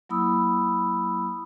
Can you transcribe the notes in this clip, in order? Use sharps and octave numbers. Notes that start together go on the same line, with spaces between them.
F#3 A#3 E4 B5 D#6 E6